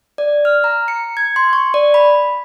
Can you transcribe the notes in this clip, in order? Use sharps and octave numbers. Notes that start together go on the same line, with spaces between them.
D5
F6
A#5
C#7
G#6
C6
C#6
D5
B5